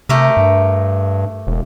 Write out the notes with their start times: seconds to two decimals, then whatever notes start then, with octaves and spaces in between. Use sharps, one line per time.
0.09 C3 A3 G4 A#4
0.37 G2
1.47 E1